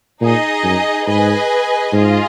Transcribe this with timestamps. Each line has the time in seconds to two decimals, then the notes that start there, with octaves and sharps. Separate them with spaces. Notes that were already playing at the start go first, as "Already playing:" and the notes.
0.21 A#2 D#4 G#4 D#5
0.63 F#2
1.07 G#2 G#4 B4 D#5 G#5
1.93 G#2 F4 G#4 D#5